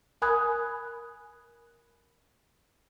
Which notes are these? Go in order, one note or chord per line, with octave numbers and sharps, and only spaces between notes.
A#4 G#5 B5 D#6 F#6 G#6